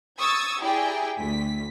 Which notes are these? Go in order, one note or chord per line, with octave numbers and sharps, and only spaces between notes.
C#6 D#6 E6 G#6 A6
E4 G4 G#4 D5 G5 A#5
D2 B6